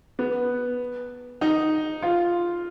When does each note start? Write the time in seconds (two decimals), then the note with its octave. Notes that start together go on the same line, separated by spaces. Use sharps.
0.19 B3
1.41 D#4
2.02 F4